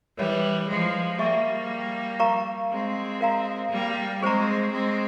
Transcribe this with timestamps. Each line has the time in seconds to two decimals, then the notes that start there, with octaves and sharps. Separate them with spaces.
0.17 E3 G3 A#4 C#5 E5
0.68 F3 G#3
1.19 G3 A#3 G#4 E5 G#5 C#6
2.20 A#4 F5 A#5 C#6
2.70 G#3 C4
3.21 A#4 F5 A#5
3.71 G3 A#3
4.22 G#3 C4 G#4 C5 G5 A#5 C#6
4.73 G#3 C4